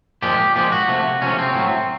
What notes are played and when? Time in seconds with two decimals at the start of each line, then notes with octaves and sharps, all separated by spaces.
0.22 A#2 F3 G#3 G4
0.56 A#2 F3 G#3 G4
0.72 F#4
0.88 C3 F3 A3
1.22 C3 F3 A3 C#4
1.39 C4
1.55 A2 F#3 A3